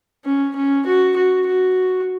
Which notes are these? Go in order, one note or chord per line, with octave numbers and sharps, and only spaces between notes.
C#4
C#4
F#4
F#4
F#4